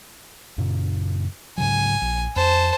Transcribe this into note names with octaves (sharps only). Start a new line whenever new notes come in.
F#2 A#2 C#3
G#2 C#3 F#3 G#5
A#1
F2 C5 A5